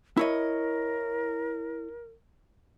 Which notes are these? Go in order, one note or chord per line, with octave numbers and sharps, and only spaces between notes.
E4 A#4 C#5 D#5